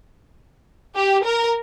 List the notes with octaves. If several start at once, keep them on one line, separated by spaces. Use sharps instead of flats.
G4
A#4